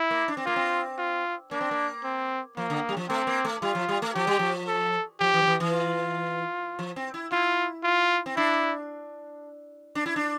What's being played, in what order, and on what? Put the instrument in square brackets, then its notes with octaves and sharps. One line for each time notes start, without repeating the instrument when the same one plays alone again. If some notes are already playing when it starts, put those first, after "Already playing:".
Already playing: [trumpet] E4
[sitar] A#3
D4
C4
[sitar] A#3 [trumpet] F4
[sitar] C4
[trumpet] F4
[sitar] A#3 [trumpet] D4
[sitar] C4
A#3
[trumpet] C4
[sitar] F3 [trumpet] A#3
[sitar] D3
G3
F3
[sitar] A3 [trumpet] C4
[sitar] A#3
A3
[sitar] G3 [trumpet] F4
[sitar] F3
G3
A3
[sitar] F3 [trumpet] G4
[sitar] G3
F3
[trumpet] A4
[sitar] F3 [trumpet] G4
[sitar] E3
F3
E3
E3
[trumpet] F4
[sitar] F3
C4
E4
[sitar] E4 [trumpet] F4
[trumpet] F4
[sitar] C4
[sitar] D4 [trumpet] E4
[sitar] D4
E4
D4